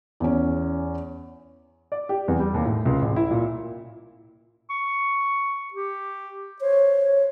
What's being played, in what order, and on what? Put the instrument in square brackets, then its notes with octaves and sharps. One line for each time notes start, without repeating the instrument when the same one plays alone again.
[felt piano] E2 C#4
[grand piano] D5
G4
E2
G3
D#2
A2
C#2
A1
E4
A#2
[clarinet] C#6
G4
[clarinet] C5 [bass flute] C#5